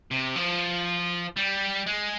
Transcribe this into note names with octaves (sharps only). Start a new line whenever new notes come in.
C3
F3
G3
G#3